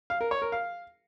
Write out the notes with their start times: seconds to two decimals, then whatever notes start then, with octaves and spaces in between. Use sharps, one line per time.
0.10 F5
0.21 A#4
0.31 C#5
0.42 A#4
0.52 F5